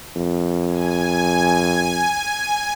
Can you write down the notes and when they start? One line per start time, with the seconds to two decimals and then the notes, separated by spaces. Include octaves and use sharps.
0.16 F2
0.69 G#5